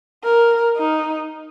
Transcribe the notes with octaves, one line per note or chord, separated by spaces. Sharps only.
A#4
D#4